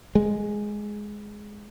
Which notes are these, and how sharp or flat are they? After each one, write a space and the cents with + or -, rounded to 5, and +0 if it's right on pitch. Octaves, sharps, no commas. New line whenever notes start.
G#3 +0